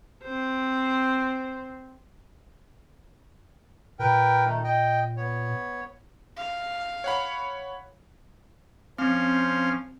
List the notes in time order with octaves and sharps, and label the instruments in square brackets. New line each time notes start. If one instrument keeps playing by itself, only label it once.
[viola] C4 C5
[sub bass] A#2 [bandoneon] A#4 B4 G5
[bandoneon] D#3 A3 D#4
D#5 G5
B3 C#5
[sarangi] F5
[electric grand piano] C#5 F#5 B5
[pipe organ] F3 C#4 [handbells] C4 [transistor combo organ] C5 F5